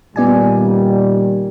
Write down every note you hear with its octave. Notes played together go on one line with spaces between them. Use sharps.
A#2 D#3 G3 B3 D5 G#5